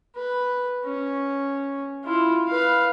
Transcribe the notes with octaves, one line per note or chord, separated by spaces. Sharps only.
B4
C#4
E4 F4
B4 F5